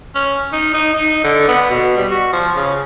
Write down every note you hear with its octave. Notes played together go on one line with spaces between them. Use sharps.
C#4
D#4
D#4
D#4
D3
B3
B2
G3
F#4
F3
C#3